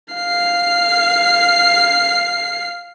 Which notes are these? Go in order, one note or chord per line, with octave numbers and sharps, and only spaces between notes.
F5 C7